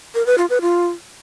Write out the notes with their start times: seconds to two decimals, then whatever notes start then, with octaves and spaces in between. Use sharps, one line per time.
0.15 A#4
0.26 B4
0.38 F4
0.50 B4
0.62 F4